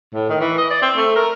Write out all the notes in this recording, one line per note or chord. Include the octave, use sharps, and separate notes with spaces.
A2
D#3
E3
D#5
D5
C4
A3
A#4